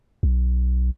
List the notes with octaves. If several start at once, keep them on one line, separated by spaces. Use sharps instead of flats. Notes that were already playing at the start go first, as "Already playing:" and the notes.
B1